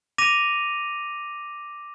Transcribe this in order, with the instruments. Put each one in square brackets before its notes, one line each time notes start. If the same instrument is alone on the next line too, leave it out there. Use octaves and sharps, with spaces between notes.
[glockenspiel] D6 A#6 D#7 F7